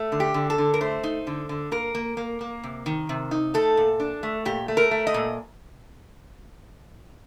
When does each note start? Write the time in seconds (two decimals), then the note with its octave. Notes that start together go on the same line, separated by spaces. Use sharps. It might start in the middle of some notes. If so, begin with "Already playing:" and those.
Already playing: A3
0.12 D3
0.20 G4
0.34 D3
0.50 A4
0.58 D3
0.74 A#4
0.81 A3 C5
1.03 D#4
1.27 D3
1.49 D3
1.72 A#3 A#4
1.95 A#3
2.17 A#3
2.41 A#3
2.63 C3
2.86 D#3
3.09 C3
3.31 D#4
3.54 A3 A4
3.77 A#2
4.00 D4
4.23 A3
4.45 A#2 G4
4.68 A3
4.77 A#4
4.91 A3
5.07 D#5
5.14 A#2